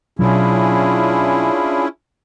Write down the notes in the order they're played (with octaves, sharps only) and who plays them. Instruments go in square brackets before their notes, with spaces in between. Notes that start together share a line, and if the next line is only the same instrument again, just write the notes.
[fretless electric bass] B2 F#3 [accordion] C#4 E4 [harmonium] D4 F4 G#4